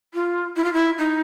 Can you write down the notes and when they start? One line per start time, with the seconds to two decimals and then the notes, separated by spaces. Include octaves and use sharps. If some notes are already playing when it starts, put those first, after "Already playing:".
0.13 F4
0.56 E4
0.63 F4
0.73 E4
0.97 D#4